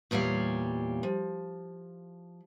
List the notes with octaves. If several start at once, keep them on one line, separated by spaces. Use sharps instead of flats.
E2 A#2 G3 C#5 F5
F3